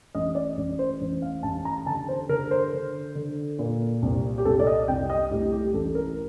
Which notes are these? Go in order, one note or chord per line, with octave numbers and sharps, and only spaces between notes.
A1 D#5
D5
A1
C5
A1
F5
A1 A5
A#5
D3 A5
C5
D3 A#4
C5
D3
D3
A#2
C2
G4
C2 A4
D5
D#5
C2 G5
D#5
A2 G4
G4
A1 A4
A#4